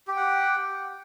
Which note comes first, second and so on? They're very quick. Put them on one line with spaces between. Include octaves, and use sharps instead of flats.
G4 G5 F#5